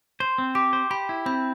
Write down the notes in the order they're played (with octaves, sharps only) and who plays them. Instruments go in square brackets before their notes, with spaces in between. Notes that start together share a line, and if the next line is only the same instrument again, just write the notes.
[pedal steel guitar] C5 [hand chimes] C6
[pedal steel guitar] C4
[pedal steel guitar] G4 [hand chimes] D6
[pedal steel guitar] C5
[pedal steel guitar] G4 [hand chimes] B5
[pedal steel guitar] E4
[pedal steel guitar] C4 [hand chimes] B5